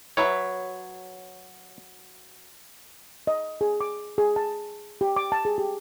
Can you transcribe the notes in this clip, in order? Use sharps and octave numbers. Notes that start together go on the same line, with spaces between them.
F#3 B4 C#5 E5
D#5
G#4
D6
G#4
A5
G4
D6
A5
G#4
G4